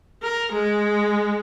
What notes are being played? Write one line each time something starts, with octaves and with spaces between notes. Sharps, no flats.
A#4
G#3